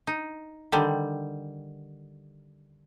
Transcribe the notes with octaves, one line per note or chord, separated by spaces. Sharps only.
D#4
D3 D#3 G3